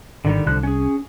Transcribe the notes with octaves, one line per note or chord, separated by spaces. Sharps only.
G#1 D3 D#3 G3
C2 D3 F3 F#6
C#4 G#4